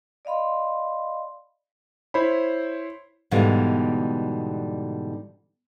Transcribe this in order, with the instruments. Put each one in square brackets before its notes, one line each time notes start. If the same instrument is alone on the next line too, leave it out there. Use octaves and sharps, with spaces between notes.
[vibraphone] D5 D#5 F5 B5 C6
[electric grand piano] E4 C5 C#5 B5
[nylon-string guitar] G#2 B2 D3 E3 G3 A#3